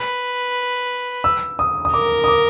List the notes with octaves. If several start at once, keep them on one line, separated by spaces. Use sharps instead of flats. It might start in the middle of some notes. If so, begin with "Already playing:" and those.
Already playing: B4
E6
D#6
D#6
A#4 D6
D#6
D6